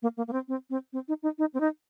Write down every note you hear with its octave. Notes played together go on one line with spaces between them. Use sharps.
A#3
A#3
A#3
C4
C4
C4
C4
D#4
D#4
D#4
C4
D#4